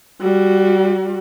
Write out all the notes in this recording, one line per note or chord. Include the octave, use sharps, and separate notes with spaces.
G3 F#4